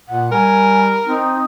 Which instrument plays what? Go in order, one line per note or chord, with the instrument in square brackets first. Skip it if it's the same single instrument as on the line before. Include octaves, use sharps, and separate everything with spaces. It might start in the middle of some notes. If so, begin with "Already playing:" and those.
[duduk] A#2 [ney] F#5
[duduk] G3 [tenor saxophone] A#4 [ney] G#5
[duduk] C4 [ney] D#4